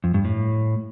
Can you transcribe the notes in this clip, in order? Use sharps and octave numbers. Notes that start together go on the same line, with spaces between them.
F2
G2
A2